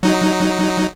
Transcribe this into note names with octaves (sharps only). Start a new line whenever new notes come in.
F#3 D#4